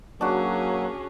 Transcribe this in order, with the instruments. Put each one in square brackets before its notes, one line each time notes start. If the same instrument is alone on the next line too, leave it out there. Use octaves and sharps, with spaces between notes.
[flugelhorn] F#3 [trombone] A#3 [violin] C#4 G#4 [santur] D4 F#4